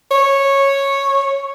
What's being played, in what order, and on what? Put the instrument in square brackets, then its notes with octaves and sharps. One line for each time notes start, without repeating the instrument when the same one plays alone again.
[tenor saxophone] C#5